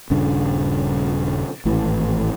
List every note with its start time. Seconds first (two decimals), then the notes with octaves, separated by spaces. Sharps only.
0.10 D#1 G2 C#3 D4
1.65 G#1 A2 E3